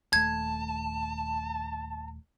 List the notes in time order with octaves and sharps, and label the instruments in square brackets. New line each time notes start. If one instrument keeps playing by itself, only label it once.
[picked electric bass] D#1 D#2 A3 [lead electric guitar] A5 [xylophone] G#6